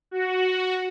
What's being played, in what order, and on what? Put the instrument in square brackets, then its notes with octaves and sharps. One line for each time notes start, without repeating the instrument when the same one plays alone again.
[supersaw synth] F#4